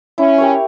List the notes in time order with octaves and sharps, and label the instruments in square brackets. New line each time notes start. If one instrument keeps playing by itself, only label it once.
[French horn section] C#4 [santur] E4
[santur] G4 A#4 C#5